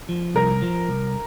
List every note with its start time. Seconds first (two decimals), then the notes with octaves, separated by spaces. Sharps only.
0.09 F3
0.35 C2 A#4
0.62 F3
0.89 C2